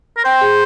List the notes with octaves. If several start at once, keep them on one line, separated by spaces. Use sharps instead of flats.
A#4
C5 G5
G#4